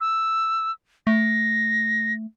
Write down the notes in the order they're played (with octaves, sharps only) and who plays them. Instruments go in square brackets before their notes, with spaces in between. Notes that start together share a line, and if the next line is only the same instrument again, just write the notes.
[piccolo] E6
[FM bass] A3 [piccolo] A#6